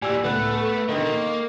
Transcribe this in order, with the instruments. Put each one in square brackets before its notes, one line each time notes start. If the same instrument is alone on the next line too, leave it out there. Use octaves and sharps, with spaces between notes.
[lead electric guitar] A#2 E3 [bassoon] G3 [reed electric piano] G#5 E6
[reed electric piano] C#2 A2 F#6 [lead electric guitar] A3 [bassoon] B3
[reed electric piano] A4
[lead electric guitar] B2 D3 [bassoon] D#3
[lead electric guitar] A#3